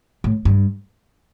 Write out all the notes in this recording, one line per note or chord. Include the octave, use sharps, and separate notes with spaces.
A2
G2